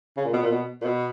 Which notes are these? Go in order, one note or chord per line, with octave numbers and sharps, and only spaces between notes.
C#3
A#2
B2
A#2
B2
A#2
B2